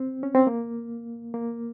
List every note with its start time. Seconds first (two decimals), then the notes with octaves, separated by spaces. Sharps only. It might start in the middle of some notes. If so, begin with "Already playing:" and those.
Already playing: C4
0.23 C#4
0.35 C4
0.47 A#3
1.34 A#3